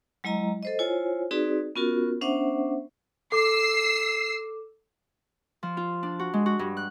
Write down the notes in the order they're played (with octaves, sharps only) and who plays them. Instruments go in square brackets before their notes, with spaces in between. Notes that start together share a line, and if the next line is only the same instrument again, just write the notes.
[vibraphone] F#3 G#3 E4 D#5 A#5
A4 C5 D#5
E4 F4 C5 C#5 G#5
C4 D#4 F#4 G#4 B4 D5
B3 C#4 F4 F#4 A#4
B3 C#4 D4 C5 E5 F#5
[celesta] A4 D6 [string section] E6 C7
[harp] F3
F4
D4
F#4
G#3
F#4
G2
F#6